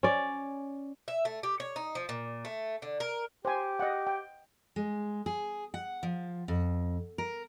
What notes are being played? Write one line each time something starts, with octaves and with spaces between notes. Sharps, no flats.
C#4 D5
E5
A3
G4
C#5
D#4
F3
A#2
A3
D3
A#4
G4 C5 G#5
D#5 F#5
G5
G#3
G#4
F#5
F3
F2
A#4